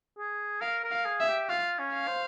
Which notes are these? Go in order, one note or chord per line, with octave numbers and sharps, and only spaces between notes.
G#4
A#4 F5
A#4
F5
G#4
E5
G4
F4 F5
C#4
F5
C5